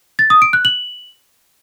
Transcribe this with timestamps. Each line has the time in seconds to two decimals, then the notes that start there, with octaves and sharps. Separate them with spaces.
0.19 A6
0.30 D#6
0.42 D7
0.53 F#6
0.65 F#7